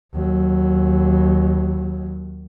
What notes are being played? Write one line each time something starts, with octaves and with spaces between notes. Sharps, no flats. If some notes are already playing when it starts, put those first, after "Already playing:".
D#2 F#3